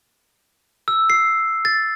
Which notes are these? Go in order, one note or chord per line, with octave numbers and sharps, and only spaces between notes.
E6
C7
A6